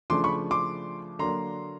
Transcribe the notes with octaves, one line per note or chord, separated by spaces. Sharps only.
C#3 F3 A3 D4 C6 D6
B5 C#6
C6 D6
D3 F#3 A#3 D4 A#5 C6